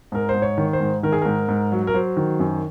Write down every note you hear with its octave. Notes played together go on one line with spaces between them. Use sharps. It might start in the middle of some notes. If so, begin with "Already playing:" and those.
G#2 A#4
C5
G#2
C#5
D#3
C5
G#2
D#3 A#4
G#4
G#2 A#4
G#2
F#3
A#4
F#3 C5
D#3
F#2